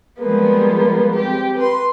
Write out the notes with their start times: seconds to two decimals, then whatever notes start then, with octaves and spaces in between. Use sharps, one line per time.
0.19 F3 G3 G#3 A#3 B3
1.13 C4 G4
1.56 B4 C6